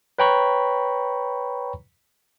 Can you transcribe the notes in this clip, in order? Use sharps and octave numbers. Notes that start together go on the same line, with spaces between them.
B4 C#5 G5 A#5 B5 C#6